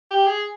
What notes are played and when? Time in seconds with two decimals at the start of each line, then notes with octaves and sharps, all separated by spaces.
0.11 G4
0.27 G#4